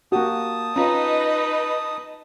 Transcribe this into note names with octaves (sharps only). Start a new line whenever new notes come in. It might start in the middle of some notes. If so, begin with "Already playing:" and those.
A#3 F#4 G4 A5 D#6
C#4 D#4 F4 B4 D#5 A#5